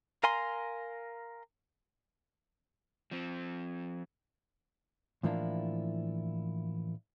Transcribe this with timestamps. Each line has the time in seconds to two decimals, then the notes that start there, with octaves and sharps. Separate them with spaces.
0.23 A#4 F5 G#5 A#5 C6
3.11 F3 C4
5.23 A2 E3 F3 A#3 D4 E4